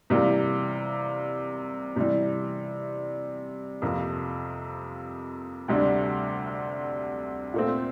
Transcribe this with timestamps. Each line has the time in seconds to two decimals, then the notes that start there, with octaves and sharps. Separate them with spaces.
0.10 C3 E3 G3 A#3
1.96 C3 E3 G3
3.82 F2 C3 F3 A#3
5.68 D2 C3 G3 D4
7.53 A#2 A3 C4